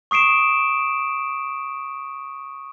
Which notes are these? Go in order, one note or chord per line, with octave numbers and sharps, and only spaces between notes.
C#6 D#6 C7 D7 E7